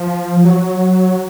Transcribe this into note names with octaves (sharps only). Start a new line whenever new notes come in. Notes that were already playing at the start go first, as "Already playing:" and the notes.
Already playing: F3
F#3